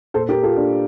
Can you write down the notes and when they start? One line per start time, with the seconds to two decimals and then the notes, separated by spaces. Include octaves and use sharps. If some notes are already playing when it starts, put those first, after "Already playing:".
0.14 A#2 A4 C5
0.29 G4 A#4
0.43 F4 A4
0.57 A#2 D4